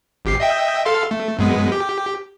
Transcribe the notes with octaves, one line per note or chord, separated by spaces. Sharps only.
G#1 G4 C7
D#5 E5 G5
A4 F5 C6
A3
F#2 G#3 B3
G4